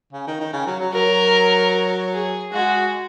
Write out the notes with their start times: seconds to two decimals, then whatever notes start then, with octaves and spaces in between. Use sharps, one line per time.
0.13 C#3
0.27 D#3
0.40 D#3
0.53 C#3
0.67 F#3
0.80 F#3
0.93 F#3 A#4
2.13 G#4
2.53 G#3 F#4